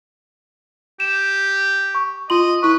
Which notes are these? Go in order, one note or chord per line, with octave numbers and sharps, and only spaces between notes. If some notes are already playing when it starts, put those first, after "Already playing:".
G4 E7
C#6
F4 D#5 C6 F#7
E4 B4 C#6